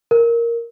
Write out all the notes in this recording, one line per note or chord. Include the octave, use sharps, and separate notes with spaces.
A#4